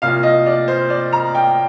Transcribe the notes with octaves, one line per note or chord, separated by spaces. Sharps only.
C2 A#2 F3 F5
D#5
D5
C5
D5
A#5
G5